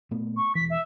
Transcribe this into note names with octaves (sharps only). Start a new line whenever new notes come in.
A#2 A3 B3
C#6
E1 E3 B6
E5